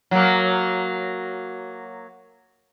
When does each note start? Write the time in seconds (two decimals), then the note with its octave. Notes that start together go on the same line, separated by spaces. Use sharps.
0.11 F#3 A#3